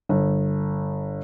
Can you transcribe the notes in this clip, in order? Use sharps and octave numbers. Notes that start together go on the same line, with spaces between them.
G1